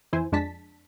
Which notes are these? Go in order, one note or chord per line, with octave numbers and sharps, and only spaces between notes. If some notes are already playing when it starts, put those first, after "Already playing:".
F2 E3 E4 C5 G#5
F2 G#3 D4 A5 B6